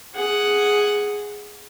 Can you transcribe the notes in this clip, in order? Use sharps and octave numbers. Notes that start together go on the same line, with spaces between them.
G#4 F#5